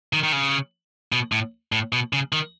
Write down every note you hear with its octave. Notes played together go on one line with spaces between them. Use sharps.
D#3
D#3
C#3
B2
A2
A2
B2
C#3
D#3